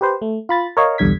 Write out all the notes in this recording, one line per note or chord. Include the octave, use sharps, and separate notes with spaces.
G4 B4 C5
A3
F4 B5 A6
A#4 C#5 D#5 F5
B1 E2 G2 D3 G#6 B6